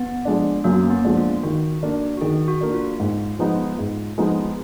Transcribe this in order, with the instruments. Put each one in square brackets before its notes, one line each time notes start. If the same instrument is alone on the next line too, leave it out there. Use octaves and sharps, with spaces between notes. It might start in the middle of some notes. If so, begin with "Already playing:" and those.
Already playing: [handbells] B3
[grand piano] F3 G#3 D4
[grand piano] F#2 [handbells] A#3
[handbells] A#3
B3
[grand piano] F3 G#3 D4
[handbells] F4
[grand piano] D#3 [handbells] F#4
[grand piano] A#3 D4
[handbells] F#4
[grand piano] D#3 [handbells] G#4
[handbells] F#4
[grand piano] A#3 D4
[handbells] F4
[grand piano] G#2
F3 G#3 B3 D#4
G#2
F3 G#3 B3 D#4